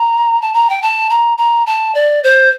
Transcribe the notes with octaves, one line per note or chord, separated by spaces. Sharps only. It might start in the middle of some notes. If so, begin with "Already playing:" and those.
Already playing: A#5
A5
A#5
G5
A5
A#5
A#5
A5
D5
C5